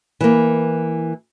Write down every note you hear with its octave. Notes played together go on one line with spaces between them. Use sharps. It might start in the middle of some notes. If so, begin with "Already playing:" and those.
E3 A#3